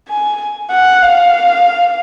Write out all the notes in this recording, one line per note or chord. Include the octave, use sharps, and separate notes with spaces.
G#5
F#5
F5